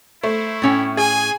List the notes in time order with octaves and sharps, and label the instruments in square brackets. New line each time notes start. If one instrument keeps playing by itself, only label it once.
[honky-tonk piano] A3 [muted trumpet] E4 [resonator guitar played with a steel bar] C5
[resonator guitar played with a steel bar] A2 C#4 G5
[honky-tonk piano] G#4 [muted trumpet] G#5